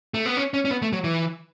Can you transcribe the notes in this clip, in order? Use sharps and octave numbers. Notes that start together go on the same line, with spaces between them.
A3
B3
C#4
C#4
C#4
B3
A3
F#3
E3